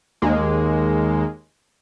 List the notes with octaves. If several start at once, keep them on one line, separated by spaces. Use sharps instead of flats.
D#2 G#3 A#3